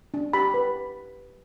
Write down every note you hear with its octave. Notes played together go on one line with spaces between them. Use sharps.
D4
G4 B5
B4